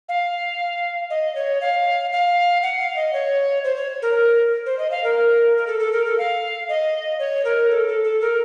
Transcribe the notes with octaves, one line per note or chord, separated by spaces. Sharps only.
F5
D#5
C#5
F5
F5
F#5
F5
D#5
C#5
C5
C#5
A#4
C5
D#5
F5
A#4
A#4
A4
A4
A#4
A4
F5
D#5
C#5
A#4
A4
A4
A4
A#4